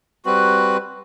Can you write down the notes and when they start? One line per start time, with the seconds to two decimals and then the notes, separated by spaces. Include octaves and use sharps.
0.25 G3 C4 F#4 B4